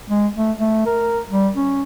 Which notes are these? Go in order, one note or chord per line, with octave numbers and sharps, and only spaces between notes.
G#3
A3
A3
A#4
G3
C#4